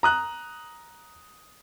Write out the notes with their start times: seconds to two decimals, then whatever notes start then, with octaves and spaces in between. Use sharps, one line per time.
0.03 A#5 D#6 F#6